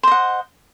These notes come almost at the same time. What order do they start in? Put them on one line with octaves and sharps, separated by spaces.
C5 D#5 F#5